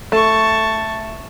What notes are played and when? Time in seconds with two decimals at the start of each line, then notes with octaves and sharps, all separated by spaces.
0.12 A3 A5 C#6